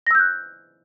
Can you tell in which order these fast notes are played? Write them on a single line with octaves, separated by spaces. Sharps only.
A#6 E6 G6 F#6